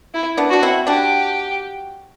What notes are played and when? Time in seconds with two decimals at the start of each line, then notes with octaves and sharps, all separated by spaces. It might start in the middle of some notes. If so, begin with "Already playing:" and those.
0.14 E4
0.37 B3 D4
0.50 D4 F#4
0.63 C4 E4
0.86 D4 F#4 G4